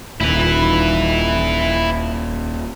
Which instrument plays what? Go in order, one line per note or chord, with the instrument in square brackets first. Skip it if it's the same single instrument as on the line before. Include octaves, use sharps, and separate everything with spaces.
[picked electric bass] D#1 [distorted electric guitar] E4 B4